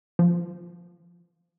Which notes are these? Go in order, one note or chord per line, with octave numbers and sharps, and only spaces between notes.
F3